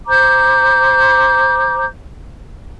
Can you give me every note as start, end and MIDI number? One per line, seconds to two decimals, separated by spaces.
0.08 1.85 72
0.08 1.85 82
0.08 1.85 86
0.08 1.85 91